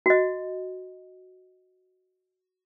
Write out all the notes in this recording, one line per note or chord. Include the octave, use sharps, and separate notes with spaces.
F#4 D#5